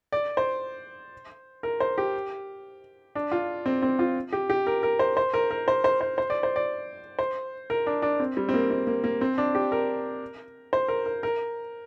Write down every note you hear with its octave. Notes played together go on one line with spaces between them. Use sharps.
D5
C5
A#4
C5
G4
D4
F4
C4
C4
F4
G4
G4
A#4
A#4
C5
C5
A#4
A#4
C5
C5
C5
C5
D5
C5
D5
C5
A#4
D4
D4
C4
G3
C4
A#3
C4
A#3
A#3
C4
D4
G4
A#4
C5
A#4
A#4
A#4